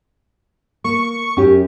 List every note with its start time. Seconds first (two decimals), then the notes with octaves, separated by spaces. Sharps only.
0.84 A#3 C#6
1.37 F#2 C#4 G4